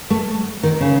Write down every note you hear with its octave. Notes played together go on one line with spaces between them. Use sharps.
A3
D#3
C#3